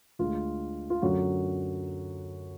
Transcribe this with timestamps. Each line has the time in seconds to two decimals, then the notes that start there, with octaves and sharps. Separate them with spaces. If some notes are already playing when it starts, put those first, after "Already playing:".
0.19 D2 D3 G#3 F4
0.90 F4
1.02 F#2 D3 F#3 A3 F#4